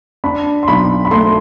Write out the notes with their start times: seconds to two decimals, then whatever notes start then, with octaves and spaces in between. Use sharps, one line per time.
0.24 D4 B5
0.63 C6
0.68 B1 B5
1.05 B5
1.11 A3 C6